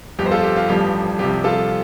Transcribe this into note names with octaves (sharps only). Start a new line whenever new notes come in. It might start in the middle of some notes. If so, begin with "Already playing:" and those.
G1 F2 F3 G4
C5
F4 A4
G4
F4
A1 G2 F3 G4
C2 C3 F3 G4
F4 A4